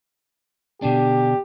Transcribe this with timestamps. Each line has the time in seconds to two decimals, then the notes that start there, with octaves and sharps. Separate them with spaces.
0.82 B2 D3 D4 G4